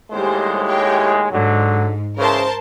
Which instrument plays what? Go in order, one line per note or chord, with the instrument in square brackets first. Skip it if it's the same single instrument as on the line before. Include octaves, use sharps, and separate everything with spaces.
[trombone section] D#2 A2 G#3 [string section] G3 C5
[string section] G4 C#5 G5
[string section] G#2 [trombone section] D3 F#3
[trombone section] C#3 E3 [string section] A#4 C5 A5